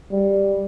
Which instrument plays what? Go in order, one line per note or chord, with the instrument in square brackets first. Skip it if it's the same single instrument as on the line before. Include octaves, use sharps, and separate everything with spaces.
[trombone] G3